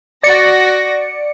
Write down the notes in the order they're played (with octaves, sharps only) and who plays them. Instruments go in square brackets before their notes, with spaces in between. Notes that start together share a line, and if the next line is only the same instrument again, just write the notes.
[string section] F#4 A#6 [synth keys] D5 C#7